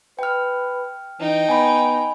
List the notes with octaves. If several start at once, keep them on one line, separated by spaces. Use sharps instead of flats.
B4 G5 F6
E3 D#4 G5
B3 G#5 B5